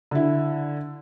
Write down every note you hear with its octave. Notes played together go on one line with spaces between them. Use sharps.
D3 E4